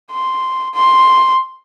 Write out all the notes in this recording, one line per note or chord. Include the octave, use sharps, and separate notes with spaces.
C6
C6